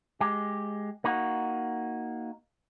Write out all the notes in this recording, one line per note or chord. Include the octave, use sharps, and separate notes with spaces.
G#3 G4
A#3 D#4 F#4